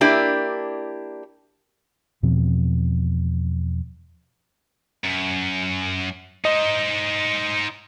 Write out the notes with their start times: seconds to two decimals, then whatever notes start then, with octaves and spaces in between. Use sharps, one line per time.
0.01 A#3 D4 E4 G4
2.23 E2 B2 F3 C4
5.04 F#2
6.45 D#4 C5 D#5